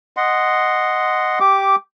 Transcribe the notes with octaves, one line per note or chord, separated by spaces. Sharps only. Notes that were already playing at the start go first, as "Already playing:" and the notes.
D#5 F#5 C6
G4 D6